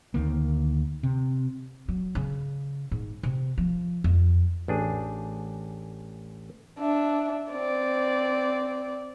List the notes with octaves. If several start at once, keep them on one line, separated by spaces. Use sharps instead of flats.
D2 D#3 A#3
C3
F#3
C#3
G#2
C3
F3
F2
A1 D4 G#4
D4 E5
C4 D5